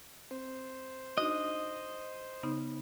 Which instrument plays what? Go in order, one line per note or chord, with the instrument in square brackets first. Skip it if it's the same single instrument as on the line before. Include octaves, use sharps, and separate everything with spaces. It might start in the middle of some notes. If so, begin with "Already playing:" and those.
[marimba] C4 [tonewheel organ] C5
[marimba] D4 D#4 F#4 [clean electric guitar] D#5
[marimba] C#3 B3 D#4